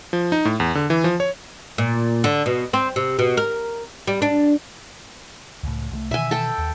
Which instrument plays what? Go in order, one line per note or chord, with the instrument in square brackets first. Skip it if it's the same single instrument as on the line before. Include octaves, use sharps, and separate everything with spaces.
[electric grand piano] F3
D#4
A2
E2
D3
E3
F3
C#5
[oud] A#2
D3
B2
C4
C3
B2
A#4
G3
D4
[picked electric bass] C#2 A2
C2 E3 A3
[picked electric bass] B2 D#3 E3 [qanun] E5 G#5
[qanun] A4 G5
[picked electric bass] D#2